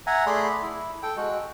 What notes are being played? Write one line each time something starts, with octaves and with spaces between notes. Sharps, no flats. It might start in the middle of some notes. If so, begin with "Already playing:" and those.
E5 F#5 G#5 A#5
A3 G#4 D5 B5 C6
E4
A4 G5
G#3 F#4